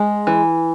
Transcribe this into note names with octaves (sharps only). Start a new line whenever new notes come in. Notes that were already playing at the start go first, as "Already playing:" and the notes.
Already playing: G#3 G#4
E3